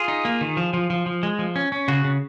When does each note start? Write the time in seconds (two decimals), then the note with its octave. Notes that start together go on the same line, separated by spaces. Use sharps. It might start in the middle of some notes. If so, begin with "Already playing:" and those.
Already playing: F4 G#4
0.08 D#4
0.25 A#3
0.41 D#3
0.57 F3
0.74 F3
0.90 F3
1.06 F3
1.23 G#3
1.39 F3
1.56 C#4
1.72 C#4
1.88 C#3 F#4
2.04 C#3